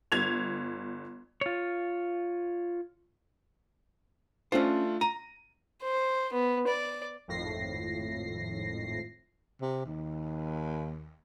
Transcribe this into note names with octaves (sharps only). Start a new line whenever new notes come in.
G1 G#6 F7
F4 C#5
A3 C#4 D4 F4 C5
A#5 D#7
C5
B3
D5
G#1 F2 A2 A#6 C7
C3
D#2